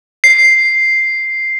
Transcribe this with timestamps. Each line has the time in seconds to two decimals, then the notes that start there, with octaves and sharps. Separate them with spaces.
0.24 C7